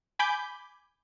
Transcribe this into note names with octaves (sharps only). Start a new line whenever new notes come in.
G#5 B5 D6 G6